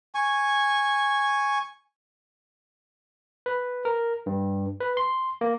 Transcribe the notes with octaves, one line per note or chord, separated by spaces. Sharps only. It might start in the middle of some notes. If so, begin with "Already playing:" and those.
G#5 C#6
B4
A#4
G2
B4
C6
A#3